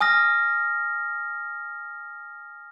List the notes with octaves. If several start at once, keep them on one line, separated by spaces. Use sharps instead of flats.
G#5 D#6 F6 A#6